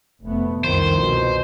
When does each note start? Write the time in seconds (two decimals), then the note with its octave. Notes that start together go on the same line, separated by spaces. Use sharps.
0.23 F1 A3 B3
0.65 C2 F2 D#3 C5
0.95 B2